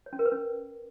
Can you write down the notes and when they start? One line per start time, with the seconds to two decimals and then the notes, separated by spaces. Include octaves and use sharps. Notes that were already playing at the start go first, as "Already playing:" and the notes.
0.06 C#5
0.13 C#4
0.19 A#4
0.25 B4
0.32 C#4